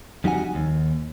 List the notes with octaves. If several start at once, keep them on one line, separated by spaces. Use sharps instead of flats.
F2 G3 D#4 F#4 F#5 G#5
D#2